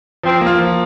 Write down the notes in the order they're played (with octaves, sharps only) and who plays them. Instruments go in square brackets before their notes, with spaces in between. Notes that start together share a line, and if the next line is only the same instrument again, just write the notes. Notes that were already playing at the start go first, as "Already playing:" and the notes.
[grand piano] F3 [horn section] C4
[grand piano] A#3
F4
F3